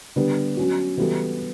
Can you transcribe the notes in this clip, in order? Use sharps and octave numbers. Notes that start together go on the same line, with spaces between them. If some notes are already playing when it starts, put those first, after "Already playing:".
D3 G3 B3
F#3 C#4 F#4
E3 G3 B3 F#4 A4